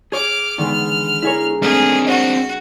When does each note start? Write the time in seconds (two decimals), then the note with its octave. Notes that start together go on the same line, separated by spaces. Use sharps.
0.12 G#4 C#5 D6 F6
0.58 E2 D3 D#3 G#3 B3 F6
1.22 D4 E4 G#4 A#4 C#5
1.62 G#2 A3 C4 D4 G#4 F6
2.07 F#4 C5 C#5 D#5